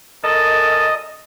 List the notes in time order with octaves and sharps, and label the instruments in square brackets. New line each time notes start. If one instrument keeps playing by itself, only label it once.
[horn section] F#2 A4 A#4 [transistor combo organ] D#5